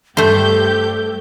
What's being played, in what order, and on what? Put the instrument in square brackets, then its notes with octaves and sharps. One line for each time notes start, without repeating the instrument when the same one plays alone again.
[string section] G2 G4 G6 [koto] A3 C5 [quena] A4